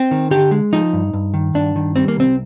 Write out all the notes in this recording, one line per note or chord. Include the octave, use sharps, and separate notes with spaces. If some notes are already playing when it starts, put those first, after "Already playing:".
Already playing: C4
D#3
D3 G4
G#3
F3 D#4
G2
G2
D#3
G2 D4
D#3
G3 C4
A#3
C2 C4